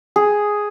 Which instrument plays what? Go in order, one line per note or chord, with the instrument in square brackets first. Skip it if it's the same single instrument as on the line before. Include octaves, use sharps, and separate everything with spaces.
[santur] G#4